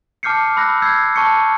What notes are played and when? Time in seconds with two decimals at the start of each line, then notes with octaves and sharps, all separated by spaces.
0.23 A5 D6 F6 G6 C7 C#7
0.57 B5 E6 F#6 A#6
0.82 E6 G6 G#6 C7
1.16 A5 C#6 C#7